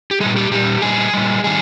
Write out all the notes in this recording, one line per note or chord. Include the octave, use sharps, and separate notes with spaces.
G4
A#2 G3 G#4
G4
A#2 G3 G4
A#2 G3 G#4
A#2 G3
D#3 G3 G#4